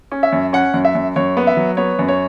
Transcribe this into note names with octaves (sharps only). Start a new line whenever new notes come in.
C#4
E5
F#2
C#4 F#5
F#2
E5
F#2
F#2 C#5
B3
E5
F#3
B3 C#5
F#2
C#5